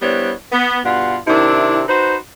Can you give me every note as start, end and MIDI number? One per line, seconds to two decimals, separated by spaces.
0.02 0.32 55
0.02 0.32 59
0.02 0.32 62
0.02 0.32 64
0.02 0.32 72
0.02 0.32 73
0.52 0.78 59
0.85 1.17 43
0.85 1.17 47
0.85 1.17 62
0.85 1.17 65
0.85 1.17 78
1.27 1.83 48
1.27 1.83 51
1.27 1.83 60
1.27 1.83 62
1.27 1.83 64
1.88 2.17 63
1.88 2.17 66
1.88 2.17 71
1.88 2.17 72